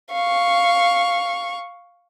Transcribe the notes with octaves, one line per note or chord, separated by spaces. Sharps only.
F5 C#6